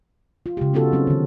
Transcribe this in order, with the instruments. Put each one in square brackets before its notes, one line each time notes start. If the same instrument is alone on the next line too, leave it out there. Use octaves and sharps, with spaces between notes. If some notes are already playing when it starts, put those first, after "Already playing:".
[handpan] F4
C#3 G#3 G4
B3 D#4 F4 F#4 A4
F#3 C4 C#4
D3 D#3